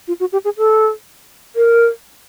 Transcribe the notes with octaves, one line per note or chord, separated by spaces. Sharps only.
F4
F#4
G4
G#4
A4
A#4